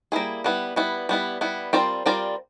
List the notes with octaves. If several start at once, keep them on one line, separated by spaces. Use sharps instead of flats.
G3 A#3 C#4 E4 G#4
G3 B3 E4
G3 B3 E4
G3 B3 E4
G3 B3 E4
G3 C4 F4 A#4 D5
G3 C4 F4 A#4 D5